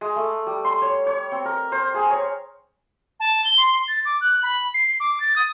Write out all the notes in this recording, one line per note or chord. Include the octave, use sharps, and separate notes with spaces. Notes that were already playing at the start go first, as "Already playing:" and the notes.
G#3
A3
G3
C6
C#5
C#5
C4
A#4
C5
G#4
C#5
A5
G7
C6
A6
D6
F#6
B5
C7
D6
A6
D#6